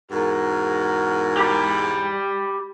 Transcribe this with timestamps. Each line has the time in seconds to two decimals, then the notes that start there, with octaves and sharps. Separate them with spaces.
0.11 E2 G#2 F#4 A#4
1.37 G4 B5